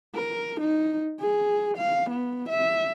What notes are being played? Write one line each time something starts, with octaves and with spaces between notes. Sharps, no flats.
A#4
D#4
G#4
F5
B3
E5